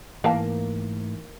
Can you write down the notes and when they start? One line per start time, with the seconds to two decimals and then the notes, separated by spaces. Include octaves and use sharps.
0.24 G#2 E3 A3 A#3 A#4 F5 A5